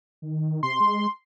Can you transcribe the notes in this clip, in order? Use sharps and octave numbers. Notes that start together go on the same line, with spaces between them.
D#3
C3 C6
G#3